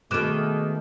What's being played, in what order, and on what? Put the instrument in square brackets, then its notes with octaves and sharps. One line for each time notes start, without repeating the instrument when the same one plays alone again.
[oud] B2 D#3 [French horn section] G#3 A3 [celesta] D6 F#6 E7